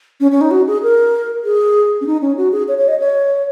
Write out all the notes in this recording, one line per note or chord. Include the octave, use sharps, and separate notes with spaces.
C#4
C#4
D#4
F#4
G#4
A#4
G#4
C#4
D#4
C#4
F#4
G#4
C#5
C#5
D#5
C#5